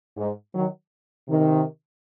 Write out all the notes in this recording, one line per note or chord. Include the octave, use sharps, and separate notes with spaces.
G#2
D#3 F#3
C3 D#3